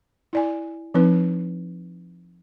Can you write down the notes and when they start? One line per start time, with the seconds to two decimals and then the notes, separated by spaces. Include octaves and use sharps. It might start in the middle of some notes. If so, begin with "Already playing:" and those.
0.33 E4 D5 G#5
0.94 F3 C4 D#4 B4